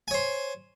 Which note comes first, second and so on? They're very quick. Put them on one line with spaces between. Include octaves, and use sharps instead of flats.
G#5 C#5 C5